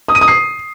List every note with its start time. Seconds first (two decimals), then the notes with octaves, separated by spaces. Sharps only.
0.08 D#6
0.15 D#7
0.21 D#6
0.28 C7